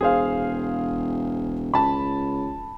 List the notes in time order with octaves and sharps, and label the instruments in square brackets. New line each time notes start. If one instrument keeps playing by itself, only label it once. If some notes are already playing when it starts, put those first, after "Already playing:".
[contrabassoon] E1 [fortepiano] G#4 C5 F5
[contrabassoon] C#2 [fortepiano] A5 B5